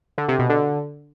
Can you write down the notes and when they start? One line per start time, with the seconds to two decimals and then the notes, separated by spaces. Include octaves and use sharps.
0.18 D3
0.28 C3
0.39 B2
0.50 D3